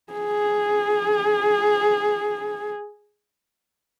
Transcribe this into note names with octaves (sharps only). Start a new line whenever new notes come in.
G#4